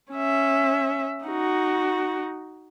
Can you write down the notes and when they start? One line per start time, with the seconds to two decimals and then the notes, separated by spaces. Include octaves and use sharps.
0.12 C#4 E5
1.25 D#4 F#4